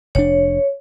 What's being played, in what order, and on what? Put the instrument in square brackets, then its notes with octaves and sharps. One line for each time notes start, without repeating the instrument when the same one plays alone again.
[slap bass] F1 B2 D4 [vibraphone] C#5